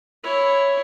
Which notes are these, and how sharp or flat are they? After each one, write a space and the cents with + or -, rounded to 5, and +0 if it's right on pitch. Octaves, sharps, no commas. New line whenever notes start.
E4 +5 C#5 +0